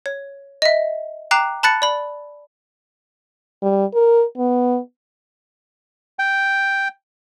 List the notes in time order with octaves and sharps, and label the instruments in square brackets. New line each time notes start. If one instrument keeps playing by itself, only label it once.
[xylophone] C#5
D#5 E5
G5 A#5 D6 F#6 C7 E7
A5 B5 F#6 A6 C#7
D5 B5
[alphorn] G3
A#4
B3
[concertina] G5